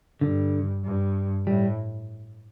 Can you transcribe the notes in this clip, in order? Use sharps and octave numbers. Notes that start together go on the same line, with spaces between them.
G2 D3
G2
A2 G3